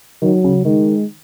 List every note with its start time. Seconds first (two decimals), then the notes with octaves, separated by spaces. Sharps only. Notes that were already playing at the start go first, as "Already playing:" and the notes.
0.22 D#3 F#3
0.44 C#3
0.65 D#3 G#3